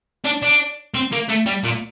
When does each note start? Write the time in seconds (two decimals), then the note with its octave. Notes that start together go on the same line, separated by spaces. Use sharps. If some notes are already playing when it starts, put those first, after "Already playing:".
0.25 D4
0.42 D4
0.94 C4
1.12 A#3
1.29 A3
1.46 G3
1.63 A#2